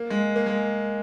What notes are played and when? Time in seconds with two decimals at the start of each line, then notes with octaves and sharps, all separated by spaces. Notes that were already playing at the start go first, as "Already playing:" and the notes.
Already playing: A#3
0.10 G#3
0.36 A#3
0.46 G#3